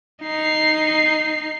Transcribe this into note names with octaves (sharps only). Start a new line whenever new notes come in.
D#4 C7